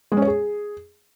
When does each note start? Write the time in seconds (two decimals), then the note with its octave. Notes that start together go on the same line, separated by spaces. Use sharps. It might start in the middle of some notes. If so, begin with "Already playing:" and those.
0.12 G#3
0.17 C#4
0.22 C#5
0.27 G#4